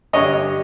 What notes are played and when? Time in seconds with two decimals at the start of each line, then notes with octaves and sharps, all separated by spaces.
0.13 G2 D3 G3 C#5 D#5